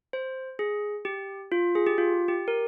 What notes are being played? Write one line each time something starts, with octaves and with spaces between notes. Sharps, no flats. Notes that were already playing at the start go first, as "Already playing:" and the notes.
C5
G#4
G4
F4
G#4
G4
F4
G4
A#4